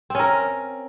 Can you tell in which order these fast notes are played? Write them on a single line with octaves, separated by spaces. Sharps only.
C4 C#4 A#4